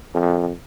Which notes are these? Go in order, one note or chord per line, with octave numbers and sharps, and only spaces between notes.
F2